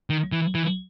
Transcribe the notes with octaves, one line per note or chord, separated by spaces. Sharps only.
D#3
E3
E3